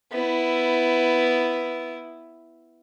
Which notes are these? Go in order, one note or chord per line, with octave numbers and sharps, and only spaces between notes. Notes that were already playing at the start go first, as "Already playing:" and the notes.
B3 E4